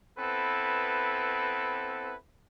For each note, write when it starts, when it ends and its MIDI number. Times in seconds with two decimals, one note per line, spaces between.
0.19 2.14 59
0.19 2.14 60
0.19 2.14 64
0.19 2.14 69
0.19 2.14 71